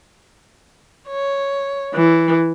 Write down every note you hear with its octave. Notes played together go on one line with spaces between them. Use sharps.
C#5
E3